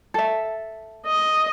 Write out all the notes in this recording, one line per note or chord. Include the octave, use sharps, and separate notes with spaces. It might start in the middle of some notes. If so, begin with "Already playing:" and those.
A4 E5
D#5